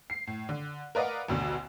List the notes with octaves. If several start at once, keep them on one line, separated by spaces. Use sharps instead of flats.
C7
A2
D3
A#4 B4 D5 D#5 F5 F#5
A1 D2 B2 D3